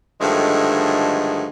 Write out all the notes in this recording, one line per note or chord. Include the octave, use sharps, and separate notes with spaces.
G2 D3 D#3 F3 G#3 A3